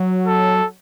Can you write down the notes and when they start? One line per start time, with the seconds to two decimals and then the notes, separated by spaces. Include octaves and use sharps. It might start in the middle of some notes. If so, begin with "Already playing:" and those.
Already playing: F#3
0.27 A4